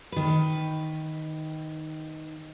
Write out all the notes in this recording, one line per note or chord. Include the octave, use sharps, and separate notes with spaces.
D#3 B4